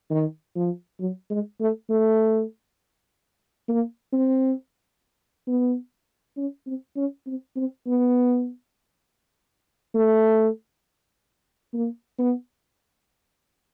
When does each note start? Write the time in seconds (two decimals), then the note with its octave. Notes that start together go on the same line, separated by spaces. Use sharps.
0.11 D#3
0.56 F3
1.00 F#3
1.30 G#3
1.60 A3
1.90 A3
3.69 A#3
4.13 C4
5.47 B3
6.37 C#4
6.67 C4
6.96 C#4
7.27 C4
7.57 C4
7.86 B3
9.95 A3
11.74 A#3
12.18 B3